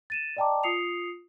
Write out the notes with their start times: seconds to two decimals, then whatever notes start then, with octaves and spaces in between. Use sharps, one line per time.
0.10 A6 D#7 E7
0.37 D5 D#5 G5 A5 A#5 D6
0.63 F4 D#6 C7 C#7 F7